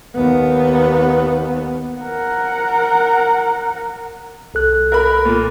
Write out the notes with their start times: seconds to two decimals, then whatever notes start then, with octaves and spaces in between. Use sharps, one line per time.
0.16 D#2 B3
2.02 A#4 F#5
4.54 C2 A4 F#6
4.92 A#4 B5
5.25 A#2